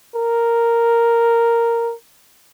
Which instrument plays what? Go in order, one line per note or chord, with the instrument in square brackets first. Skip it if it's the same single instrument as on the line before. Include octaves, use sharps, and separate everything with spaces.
[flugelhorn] A#4